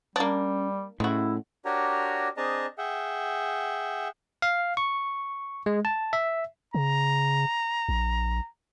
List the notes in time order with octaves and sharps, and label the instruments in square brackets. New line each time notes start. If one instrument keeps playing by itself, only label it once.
[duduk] G3 [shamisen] A#3 D4 [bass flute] C#4
[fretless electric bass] A2 [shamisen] G#3 F#4 [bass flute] C#4 [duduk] E4
[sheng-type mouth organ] D4 F#4 G4 A#4 C#5 A#5
C4 D4 G#4 D#5 A5 A#5
G#4 E5 F#5 G5
[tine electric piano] F5
C#6
G#3
A5
E5
[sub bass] C#3 [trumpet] A#5
[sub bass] A#1